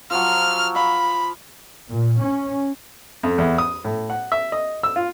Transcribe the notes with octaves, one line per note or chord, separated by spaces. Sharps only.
F3 F#3 F6
F5 B5
A#2
C#4
F2
E2
D#6
A2
F#5
E5
D#5
E6
F4